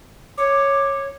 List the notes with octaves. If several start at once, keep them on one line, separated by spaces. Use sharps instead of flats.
C#5 D6